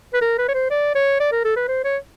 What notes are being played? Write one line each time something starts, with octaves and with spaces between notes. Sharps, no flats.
B4
A#4
B4
C#5
C5
D5
C#5
D5
A#4
A4
B4
C5
C#5